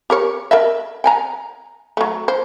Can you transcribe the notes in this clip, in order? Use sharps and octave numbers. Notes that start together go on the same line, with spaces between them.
G4 A#4 C#5
A#4 D#5 E5
G5 G#5 A#5
F#3 A3
C5